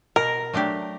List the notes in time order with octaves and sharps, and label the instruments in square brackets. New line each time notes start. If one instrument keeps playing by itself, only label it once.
[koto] B2 [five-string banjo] A#4
[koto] F#3 A3 D4 G4